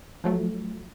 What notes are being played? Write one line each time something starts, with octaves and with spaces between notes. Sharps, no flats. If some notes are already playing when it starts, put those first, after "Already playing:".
F3 F#3 A3